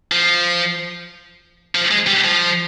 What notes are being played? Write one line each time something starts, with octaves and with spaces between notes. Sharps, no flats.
F3
F3
G#3
G3
F3